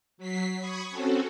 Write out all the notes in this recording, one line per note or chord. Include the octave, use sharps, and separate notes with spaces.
F#3 B6 C7
B5 C#6 D#6 G#6
C4 C#4 F#4 A4